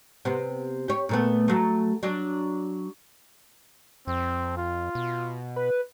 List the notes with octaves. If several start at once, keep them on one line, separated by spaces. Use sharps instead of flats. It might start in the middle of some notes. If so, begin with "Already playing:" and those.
C3 B3
G4 C#5
A#2 A3 B3
F#3 A3
F#3 D4
F2 C4
F4
B2
B4